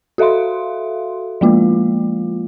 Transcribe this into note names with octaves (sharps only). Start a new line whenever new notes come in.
F#4 A4 E5 F5 C6
F3 G#3 A#3 F4